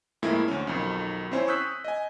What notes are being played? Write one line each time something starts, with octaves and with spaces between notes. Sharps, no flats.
F2 A2 G#3 A#3 E4
D2 C#4
B1 F2 D#3
C4 C#4 E4 C5 C#5 G#5
C#6 D#6 E6 F#6 G6 B6
D#5 G#5